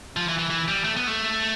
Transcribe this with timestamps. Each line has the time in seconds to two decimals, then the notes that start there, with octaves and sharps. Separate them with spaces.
0.17 F3
0.29 E3
0.39 E3
0.50 E3
0.68 G3
0.84 A3
0.97 B3
1.07 A3